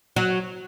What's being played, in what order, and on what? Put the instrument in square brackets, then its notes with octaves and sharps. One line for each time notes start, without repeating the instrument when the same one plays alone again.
[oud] F#3